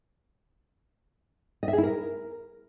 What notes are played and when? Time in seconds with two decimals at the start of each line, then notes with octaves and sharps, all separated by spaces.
1.63 D#5
1.68 E5
1.73 G#4
1.78 E4
1.83 A#4